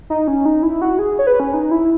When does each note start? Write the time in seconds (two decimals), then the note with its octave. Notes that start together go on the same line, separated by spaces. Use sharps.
0.10 D#4
0.28 C#4
0.45 D#4
0.63 E4
0.82 F#4
0.99 G#4
1.19 C#5
1.27 B4
1.40 C#4
1.54 D#4
1.71 E4